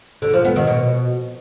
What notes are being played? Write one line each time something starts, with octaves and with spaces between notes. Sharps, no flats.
D3
F3
B3
D#3
B2